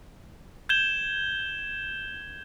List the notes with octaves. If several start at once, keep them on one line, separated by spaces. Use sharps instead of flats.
G6 G#6 E7 G7